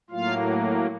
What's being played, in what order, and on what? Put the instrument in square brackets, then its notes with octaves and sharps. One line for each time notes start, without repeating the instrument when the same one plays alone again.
[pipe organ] A2 F#3 A#3 F4 F5